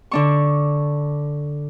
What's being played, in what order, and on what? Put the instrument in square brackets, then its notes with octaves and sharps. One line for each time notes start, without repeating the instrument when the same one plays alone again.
[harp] D3 D4 C#6